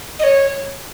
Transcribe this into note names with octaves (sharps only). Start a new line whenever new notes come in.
D#5
C#5